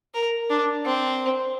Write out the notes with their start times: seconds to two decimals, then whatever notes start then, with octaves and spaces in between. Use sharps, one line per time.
0.14 A#4
0.50 D4
0.85 C4